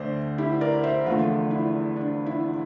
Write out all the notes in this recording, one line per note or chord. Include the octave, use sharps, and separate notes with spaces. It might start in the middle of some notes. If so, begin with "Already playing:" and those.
Already playing: D2 D3 A3 C5 D5
E4 G4
A#4 D5
C5 E5
E2 D3 F3 A3 D4 F4
E4
D4
E4